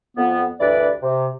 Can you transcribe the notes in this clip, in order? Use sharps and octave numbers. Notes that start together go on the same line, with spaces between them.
F2 B3
D2 G2 E3 B4 D5
C3